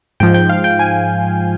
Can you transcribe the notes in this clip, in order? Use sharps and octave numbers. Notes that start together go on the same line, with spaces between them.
G#2 F3 G5
G5
F5
G5
G#5